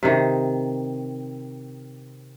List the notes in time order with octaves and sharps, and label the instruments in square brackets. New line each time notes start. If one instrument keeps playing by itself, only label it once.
[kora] C3 D#3